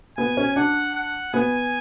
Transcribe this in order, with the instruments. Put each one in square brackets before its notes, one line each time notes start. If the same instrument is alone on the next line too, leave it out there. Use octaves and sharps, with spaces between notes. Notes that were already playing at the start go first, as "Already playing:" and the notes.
[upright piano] B3 [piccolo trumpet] G#5
[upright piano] C#4
[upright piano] D4 [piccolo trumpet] F#5
[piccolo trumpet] F#5
[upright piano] B3 [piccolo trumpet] G#5